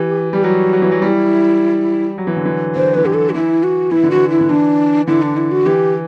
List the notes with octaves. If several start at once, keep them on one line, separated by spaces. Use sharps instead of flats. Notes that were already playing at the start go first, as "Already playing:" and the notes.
Already playing: E3 G4
G3 G4
F#3 F#4
F#3
E3
F#3
G3 E4
F#3
E3
D3
E3
D3 C5
F#3
E3 B4
D3 G4
A4
F#4
E3 E4
F#4
E3 E4
D3
E3 F#4
E4
D3
E3 D4
D3 E4
D4
E4
F#4
E3 G4